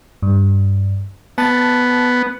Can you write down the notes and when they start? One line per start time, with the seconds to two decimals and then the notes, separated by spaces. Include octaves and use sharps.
0.23 G2
1.38 B3 A5 A6